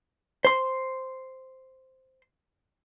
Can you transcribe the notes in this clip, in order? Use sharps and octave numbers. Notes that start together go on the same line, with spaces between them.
C5 C6